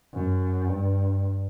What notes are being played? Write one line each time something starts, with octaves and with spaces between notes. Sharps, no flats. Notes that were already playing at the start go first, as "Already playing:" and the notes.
F#2
G2